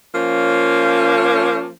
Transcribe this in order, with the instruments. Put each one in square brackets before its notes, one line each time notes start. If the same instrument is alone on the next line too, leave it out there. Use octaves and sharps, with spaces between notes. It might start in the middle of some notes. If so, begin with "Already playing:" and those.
[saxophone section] F3 A#3 C#4